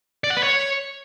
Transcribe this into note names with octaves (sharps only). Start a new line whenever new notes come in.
D5
F#5
B4
C#5